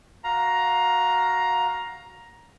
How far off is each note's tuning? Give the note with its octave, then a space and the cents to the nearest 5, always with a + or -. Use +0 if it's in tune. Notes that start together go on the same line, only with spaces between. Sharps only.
F#4 +0 F5 +10 A#5 +10